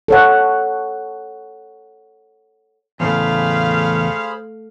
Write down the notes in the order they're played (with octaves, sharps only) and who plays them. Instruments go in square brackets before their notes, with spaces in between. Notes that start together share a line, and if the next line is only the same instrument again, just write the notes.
[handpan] A4 C#5 F#5
[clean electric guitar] E2 A2 C#3 [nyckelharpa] A3 [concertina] G#4 C5 B5 [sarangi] F5